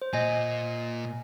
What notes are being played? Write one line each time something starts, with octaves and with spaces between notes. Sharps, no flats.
C5
A#2 D#5 G#5